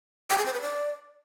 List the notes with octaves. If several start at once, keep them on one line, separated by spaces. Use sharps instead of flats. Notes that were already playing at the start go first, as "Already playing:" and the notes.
G5
G#4
C5
B4
D5